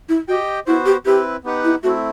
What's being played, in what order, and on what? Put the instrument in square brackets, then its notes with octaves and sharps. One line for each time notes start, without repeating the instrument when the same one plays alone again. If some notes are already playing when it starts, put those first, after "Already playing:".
[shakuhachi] E4
[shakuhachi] F#4 [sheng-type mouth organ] G4 D#5 G5
[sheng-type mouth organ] B3 F#4 C5 [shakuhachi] E4
[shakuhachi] G4
[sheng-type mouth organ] C4 E4 B4 [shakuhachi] G4
[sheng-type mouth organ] B3 D#4 G4 B4 F#5
[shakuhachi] E4
[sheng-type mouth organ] A3 C4 E4 [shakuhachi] F#4